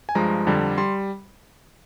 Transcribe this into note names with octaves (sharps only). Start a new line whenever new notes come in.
G#5
G2 F3 G#3 A#5
F2 D3 G3
G3 C6